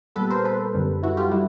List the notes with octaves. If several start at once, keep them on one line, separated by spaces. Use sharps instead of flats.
A#2 G3 B3 A4 B4
A#4 C5
A4 B4
F#2 D3 G3
E4 F#4
F4 G4
D3 G3 E4 F#4